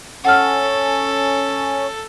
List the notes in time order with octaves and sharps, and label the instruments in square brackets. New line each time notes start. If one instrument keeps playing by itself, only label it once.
[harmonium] C#4 [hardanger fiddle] A4 [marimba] F#5 F6